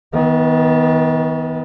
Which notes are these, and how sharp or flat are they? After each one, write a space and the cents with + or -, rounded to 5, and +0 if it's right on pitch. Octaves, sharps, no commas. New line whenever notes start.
D#3 +40 B3 +0